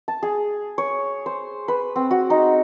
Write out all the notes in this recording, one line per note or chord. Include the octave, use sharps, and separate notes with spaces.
A5
G#4
C#5
C5
B4
C4
F#4
D#4